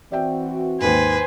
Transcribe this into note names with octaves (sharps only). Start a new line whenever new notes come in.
E3 C4 F#4 D5 E5 G5
D#2 G#2 B4 C5 G#5